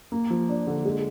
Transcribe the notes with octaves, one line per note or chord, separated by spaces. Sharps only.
A#3
F3
D4
D3
G#3